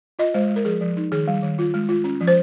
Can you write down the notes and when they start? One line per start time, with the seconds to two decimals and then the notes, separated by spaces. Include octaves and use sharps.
0.19 F4 D#5
0.34 G#3 C5
0.49 G#3
0.56 A#4
0.65 F3 G#4
0.81 F3
0.97 D#4
1.12 D#3 G#4
1.28 G3
1.42 D#3
1.59 F4
1.74 G#3
1.89 F4
2.04 C#4
2.21 F3
2.27 C5